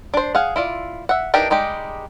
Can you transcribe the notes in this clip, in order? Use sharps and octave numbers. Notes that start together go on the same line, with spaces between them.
D4 C5
G#4 F5 F#5
E4 F4 D5
E5 F#5
E3 D4 D#4 G4 A#4
G3 G#3 D#4 G4